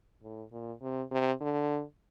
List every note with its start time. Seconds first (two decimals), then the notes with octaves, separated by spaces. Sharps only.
0.23 A2
0.52 A#2
0.82 C3
1.11 C3
1.41 D3